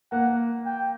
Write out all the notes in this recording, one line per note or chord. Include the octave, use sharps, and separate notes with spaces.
A#3 F#5
G5